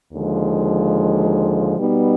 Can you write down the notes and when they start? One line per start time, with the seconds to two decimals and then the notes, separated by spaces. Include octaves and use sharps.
0.13 D#2 D3 F3 G#3
1.77 B2 G3 B3 D#4